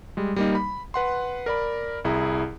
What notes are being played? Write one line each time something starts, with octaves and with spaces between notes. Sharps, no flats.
G3 G#3
G3 A#3 D#4
B5
B4 F#5 C6
A#4 D5 B5
C2 E4 G#4 A#5